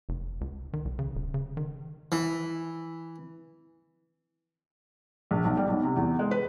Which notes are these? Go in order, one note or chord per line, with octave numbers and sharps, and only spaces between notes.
F1
C#2
D#3
C2
C#3
D#1
C#3
D#3
E3
A#1
B1
G3
B1
C3
E2
G#3
B4